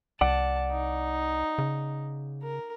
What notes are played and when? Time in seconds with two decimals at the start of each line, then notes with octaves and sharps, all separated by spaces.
0.21 C2 D5 F#5 A5
0.71 D#4
1.58 C#3
2.42 A#4